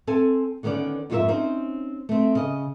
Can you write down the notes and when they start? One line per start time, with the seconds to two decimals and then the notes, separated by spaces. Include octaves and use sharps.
0.07 C4 A4 G#5
0.63 D3 D#3 B3 C#4 D5
1.10 F2 G#2 F4 F#4 A#4 E5
1.28 C4 C#4 D#4 C5
2.09 A3 C4
2.35 C#3 D#5